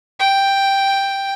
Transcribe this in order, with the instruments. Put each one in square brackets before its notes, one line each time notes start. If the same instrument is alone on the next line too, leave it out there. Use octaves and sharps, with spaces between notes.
[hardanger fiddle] G5